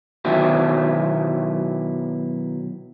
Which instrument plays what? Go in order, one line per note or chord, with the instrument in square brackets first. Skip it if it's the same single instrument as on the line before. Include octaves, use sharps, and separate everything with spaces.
[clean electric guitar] B2 D#3 F#3 B3 E4 G4